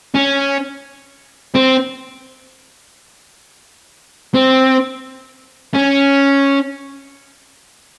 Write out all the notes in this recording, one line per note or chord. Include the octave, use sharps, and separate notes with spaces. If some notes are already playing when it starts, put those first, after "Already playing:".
C#4
C4
C4
C#4